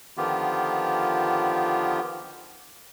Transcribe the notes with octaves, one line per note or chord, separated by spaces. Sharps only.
D3 D#3 F3 B3 F4 G4